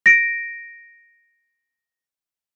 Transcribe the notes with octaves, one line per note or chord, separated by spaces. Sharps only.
A#6 D7